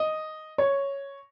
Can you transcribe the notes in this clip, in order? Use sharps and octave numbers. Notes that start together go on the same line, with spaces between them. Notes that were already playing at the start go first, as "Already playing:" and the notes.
Already playing: D#5
C#5